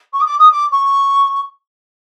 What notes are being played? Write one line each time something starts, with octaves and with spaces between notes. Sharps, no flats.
C#6
D#6
D6
D#6
D6
C#6